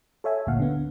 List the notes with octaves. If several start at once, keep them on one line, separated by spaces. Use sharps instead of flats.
A4 C#5 E5 G#5
G#1 D2 A#2 F5 F#5
D3 B3